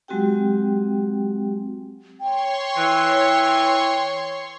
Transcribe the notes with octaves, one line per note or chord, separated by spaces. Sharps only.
F#3 G#3 C4 F#4 G4 G5
C#5 G5 C6 C#6
E3